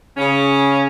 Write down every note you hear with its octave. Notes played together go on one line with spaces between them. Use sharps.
C#3 C#4